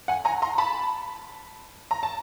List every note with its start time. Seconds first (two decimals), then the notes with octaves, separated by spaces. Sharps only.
0.08 F#5 G#5
0.25 G#5 A#5
0.42 A#5 C6
0.58 A5 B5
1.91 A#5
2.03 A5